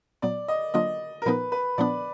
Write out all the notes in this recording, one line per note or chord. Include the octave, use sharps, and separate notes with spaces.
A#2 F#3 B3 D5
D#5
D3 F#3 A#3 D4 F4 D#5
A#4
A#2 F3 B3 D#4 B4
B4
A#2 F3 B3 D4 D5